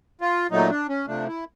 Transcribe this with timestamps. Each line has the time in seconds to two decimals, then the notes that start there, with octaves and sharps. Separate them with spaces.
0.21 F4
0.51 A#2 F#3 A3 D#4
0.70 D4
0.89 C#4
1.07 C3 F3 A3 D4
1.27 E4